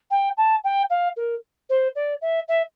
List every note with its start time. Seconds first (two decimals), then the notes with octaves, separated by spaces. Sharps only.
0.11 G5
0.37 A5
0.64 G5
0.90 F5
1.16 A#4
1.69 C5
1.95 D5
2.21 E5
2.48 E5